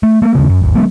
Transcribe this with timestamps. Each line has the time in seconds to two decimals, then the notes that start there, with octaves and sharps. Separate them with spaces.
0.03 A3
0.22 A3 A#3
0.35 D#2 C#3
0.49 F#2
0.62 G#1 D#2
0.75 F#3 G#3 A3 B3